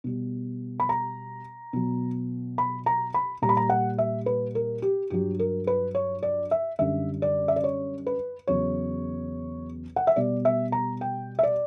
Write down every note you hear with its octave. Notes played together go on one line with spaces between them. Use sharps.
B2 G3
B5
A#5
B2 F#3
B5
A#5
B5
A#2 G3 A#5
B5
A#5
F#5
E5
B4
A#4
G4
G2 F#3 G4
A#4
B4
C#5
D5
E5
F#2 D3 G3 E5
D5
E5
D5
C#5
B4
E2 C#3 F#3 C#5
F#5
E5
B2 G3 D5
E5
A#5
G5
E5
D5